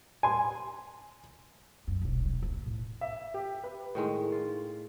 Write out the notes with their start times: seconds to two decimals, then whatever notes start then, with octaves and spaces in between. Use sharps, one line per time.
0.23 G#5 C6
1.88 F#2
2.02 D#1 B1
2.25 F3
2.43 D2
2.66 A2
3.01 E5
3.34 G4
3.64 B4
3.95 A2 D#3 G#3
4.32 F4